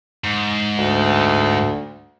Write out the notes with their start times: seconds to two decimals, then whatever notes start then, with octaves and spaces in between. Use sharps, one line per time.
0.24 G#2
0.79 D2